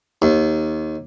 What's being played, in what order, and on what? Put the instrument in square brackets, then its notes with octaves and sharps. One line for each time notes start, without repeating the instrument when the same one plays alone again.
[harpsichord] D#2